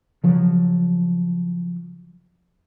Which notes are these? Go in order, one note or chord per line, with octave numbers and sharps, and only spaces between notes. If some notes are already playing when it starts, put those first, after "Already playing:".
C#3 F3 F#3